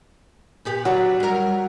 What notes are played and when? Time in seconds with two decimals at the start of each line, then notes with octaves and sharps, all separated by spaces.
0.65 A#2 B3 G4
0.85 F#3 D4 E4 B4
1.20 G3 A#4